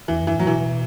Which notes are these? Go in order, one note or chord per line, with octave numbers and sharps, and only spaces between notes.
E2 E3
F#2 E3
A2 F#3
B2 E3